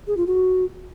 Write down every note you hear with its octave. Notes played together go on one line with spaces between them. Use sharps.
G#4
F4
F#4